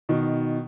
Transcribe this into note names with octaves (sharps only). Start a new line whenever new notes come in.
B2 D#3